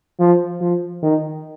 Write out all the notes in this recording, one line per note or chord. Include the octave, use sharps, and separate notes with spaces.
F3
F3
D#3